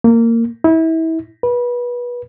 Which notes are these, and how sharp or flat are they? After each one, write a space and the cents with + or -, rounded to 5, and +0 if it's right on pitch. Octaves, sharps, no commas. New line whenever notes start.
A#3 -20
E4 -30
B4 -25